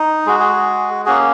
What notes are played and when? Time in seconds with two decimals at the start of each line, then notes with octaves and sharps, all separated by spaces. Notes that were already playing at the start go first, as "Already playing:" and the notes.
Already playing: D#4
0.26 G#3 F#4 G#4
0.40 G#4
0.52 G#4
1.06 A#3 C#4 F#4 G#4